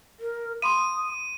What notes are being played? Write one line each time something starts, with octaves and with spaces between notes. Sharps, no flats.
A#4
F5 B5 C6 D#6 D#7